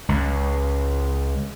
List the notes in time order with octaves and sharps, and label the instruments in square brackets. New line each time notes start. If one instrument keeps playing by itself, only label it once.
[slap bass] C#2